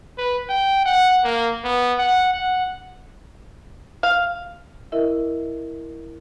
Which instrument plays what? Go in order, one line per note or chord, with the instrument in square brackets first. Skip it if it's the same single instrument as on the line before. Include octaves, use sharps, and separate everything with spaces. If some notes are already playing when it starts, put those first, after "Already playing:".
[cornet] B4
G5
F#5
A#3
B3
F#5
F#5
[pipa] F5
[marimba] E4 A#4 D#5 E5